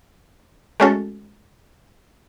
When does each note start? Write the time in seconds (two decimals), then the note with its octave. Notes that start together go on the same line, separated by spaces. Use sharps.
0.80 G#3 A3 C#4 F#4 A4